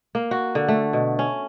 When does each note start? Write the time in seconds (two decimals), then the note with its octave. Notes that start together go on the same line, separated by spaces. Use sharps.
0.15 A#3
0.31 F#4
0.55 D3
0.68 A3
0.93 B2
1.19 C#4